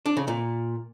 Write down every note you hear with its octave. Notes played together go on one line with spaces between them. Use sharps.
D4
C#3
A#2